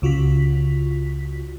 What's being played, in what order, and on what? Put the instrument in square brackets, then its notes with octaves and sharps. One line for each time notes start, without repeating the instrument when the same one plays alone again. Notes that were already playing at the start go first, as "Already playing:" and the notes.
[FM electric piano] C#2 C#3 F4 F#4 B6